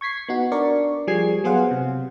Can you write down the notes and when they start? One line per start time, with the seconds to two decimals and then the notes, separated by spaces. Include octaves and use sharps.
0.01 C#6 G#6 B6 C7
0.28 B3 D#4 F#4
0.52 D4 A#4 D5 C#6
1.07 F3 G3 G#4 G#6 C7
1.44 F#3 B3 G#4 C5 F5 F#5
1.71 C3